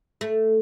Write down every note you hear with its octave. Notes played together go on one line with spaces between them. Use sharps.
A3